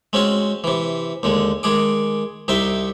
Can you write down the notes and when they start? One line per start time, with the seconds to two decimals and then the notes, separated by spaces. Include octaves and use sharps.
0.13 G#3 C4 C#4 F#4
0.64 C3 E3
1.23 D#2 D3 G#3
1.63 D#3 G#3 G#4 D6
2.48 C2 C3 D#4 E5 G5